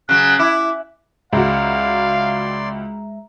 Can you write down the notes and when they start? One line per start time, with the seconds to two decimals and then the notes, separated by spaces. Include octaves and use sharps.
0.09 C#3 F#3 F#6
0.39 E4 D6
1.33 C#2 G#3 F#4 D5 E5 F5 A#5 C6